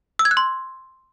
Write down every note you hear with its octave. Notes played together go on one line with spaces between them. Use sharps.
E6
G#6
F#6
C6